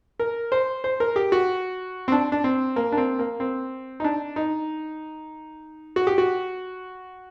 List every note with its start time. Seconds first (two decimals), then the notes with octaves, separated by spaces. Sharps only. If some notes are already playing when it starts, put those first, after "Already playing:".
0.20 A#4
0.52 C5
0.84 C5
1.00 A#4
1.16 G4
1.32 F#4
2.08 C4
2.12 D4
2.32 D4
2.44 C4
2.76 A#3
2.92 D4
2.97 C4
3.19 A#3
3.40 C4
4.00 D#4
4.04 D4
4.36 D#4
5.96 F#4
6.07 G4
6.18 F#4